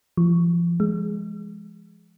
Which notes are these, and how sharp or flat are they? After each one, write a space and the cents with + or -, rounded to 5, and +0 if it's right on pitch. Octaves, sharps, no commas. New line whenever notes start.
F3 -35
G#3 +5